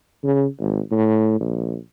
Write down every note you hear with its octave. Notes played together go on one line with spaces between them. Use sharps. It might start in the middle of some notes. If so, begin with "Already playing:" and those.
C#3
G#1
A2
A#1